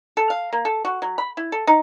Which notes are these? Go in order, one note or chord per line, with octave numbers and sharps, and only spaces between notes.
A4
F5
A#3
A4
F#4
F#3
B5
E4
A4
D#4